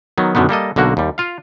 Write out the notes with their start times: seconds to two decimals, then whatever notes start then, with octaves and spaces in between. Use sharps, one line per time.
0.18 D#3 F#3 B3
0.35 F#2 B2 D3 D#3 B3
0.49 G3 A#3 A4 D#5
0.76 B1 D3 A#3 F#4
0.97 D#2 G3
1.18 F4 F5